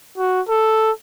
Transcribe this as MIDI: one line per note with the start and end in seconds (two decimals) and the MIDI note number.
0.18 0.41 66
0.49 0.91 69